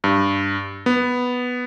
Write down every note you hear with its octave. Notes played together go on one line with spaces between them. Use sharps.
G2
B3